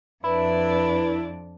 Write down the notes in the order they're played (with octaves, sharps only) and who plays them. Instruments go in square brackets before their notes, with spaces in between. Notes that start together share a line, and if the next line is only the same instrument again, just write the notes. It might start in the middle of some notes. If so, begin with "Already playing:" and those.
[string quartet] F2 D4 [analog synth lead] E4 [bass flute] B4